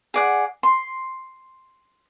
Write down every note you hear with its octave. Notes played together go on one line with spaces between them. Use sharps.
G#4 D5 F#5
C6